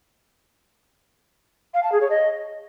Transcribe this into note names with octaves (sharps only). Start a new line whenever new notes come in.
F5
A5
G#4
C#5
D#5